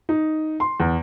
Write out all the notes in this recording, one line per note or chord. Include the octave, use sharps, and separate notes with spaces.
D#4
C6
E2